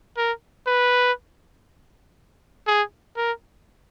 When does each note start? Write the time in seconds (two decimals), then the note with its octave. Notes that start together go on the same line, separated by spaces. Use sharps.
0.17 A#4
0.67 B4
2.67 G#4
3.17 A#4